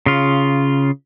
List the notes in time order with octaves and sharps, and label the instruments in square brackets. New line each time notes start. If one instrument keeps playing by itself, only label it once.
[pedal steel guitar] C#3 F4